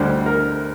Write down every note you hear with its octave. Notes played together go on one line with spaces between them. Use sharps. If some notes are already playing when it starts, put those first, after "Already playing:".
Already playing: D2 D3 G3 C5
A#4